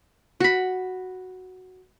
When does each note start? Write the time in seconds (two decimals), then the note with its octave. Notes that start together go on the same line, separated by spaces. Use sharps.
0.40 F#4 B5